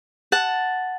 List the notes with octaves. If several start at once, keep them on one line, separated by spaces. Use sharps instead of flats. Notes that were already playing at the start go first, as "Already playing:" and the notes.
F#5 A5